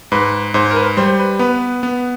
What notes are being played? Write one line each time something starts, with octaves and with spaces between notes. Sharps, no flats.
G#2 B4
G#2 C5
A#4
B4
G3 C5
B4
B3 B4
B3